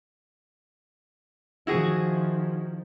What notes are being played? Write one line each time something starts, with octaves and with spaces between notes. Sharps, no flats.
D#3 F3 E4 F#4 G#4